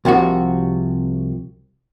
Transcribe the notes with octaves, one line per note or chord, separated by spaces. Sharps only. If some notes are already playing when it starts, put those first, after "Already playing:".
C2 C3 F3 F#4